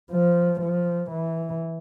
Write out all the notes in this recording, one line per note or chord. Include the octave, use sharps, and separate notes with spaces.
F3
F3
E3